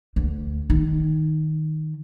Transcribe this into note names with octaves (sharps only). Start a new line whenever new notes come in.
D2
D#3